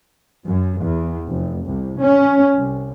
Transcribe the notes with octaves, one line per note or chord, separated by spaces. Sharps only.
F#2
E2
F1
C2
C#4
C2